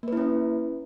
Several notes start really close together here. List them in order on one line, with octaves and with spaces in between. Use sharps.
A#3 B4 E4 C#4